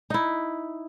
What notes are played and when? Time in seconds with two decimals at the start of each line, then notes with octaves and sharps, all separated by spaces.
0.10 D#4 E4